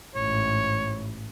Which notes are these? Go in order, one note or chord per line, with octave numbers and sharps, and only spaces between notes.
A1 G#2 C#5